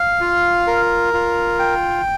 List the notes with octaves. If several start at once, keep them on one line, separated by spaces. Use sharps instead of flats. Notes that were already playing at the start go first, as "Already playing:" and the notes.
Already playing: F5
F4
A#4
F4
G5